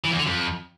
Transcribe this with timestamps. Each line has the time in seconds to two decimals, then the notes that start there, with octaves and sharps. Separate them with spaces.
0.04 E3
0.11 E2
0.19 D3
0.26 F2